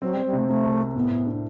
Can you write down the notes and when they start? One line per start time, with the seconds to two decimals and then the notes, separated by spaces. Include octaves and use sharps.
0.02 F#3 C4
0.13 G3
0.17 C4
0.25 G3
0.33 C3 A3
0.48 C3 A3
0.64 C2
0.80 C4
0.96 A2 B3
1.10 A2
1.27 D4